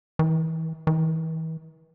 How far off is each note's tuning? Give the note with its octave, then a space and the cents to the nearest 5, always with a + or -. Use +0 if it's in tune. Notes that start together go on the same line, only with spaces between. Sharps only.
E3 -35
E3 -40